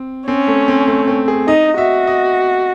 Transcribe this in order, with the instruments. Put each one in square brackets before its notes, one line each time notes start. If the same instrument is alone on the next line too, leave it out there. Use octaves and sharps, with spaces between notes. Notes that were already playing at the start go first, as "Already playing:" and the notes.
Already playing: [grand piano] C4
[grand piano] C4 [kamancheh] C#4
[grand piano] A3
C4
A3
C4
G#4
[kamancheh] D#4 [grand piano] D#5
[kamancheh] F#4 [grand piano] E5
[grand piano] D#5